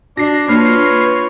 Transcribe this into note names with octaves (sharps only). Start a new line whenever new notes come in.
D4 F#4 D5 A#6 C7
A#3 D4 F4 B4 C#5 F6 G#6